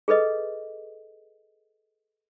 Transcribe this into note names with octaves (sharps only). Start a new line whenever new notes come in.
G#4 A4 B4 D#5